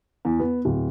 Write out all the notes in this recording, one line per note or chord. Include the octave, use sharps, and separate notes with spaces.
E2
B3
D1